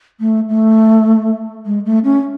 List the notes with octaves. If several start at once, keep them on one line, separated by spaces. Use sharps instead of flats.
A3
A3
G#3
A3
C#4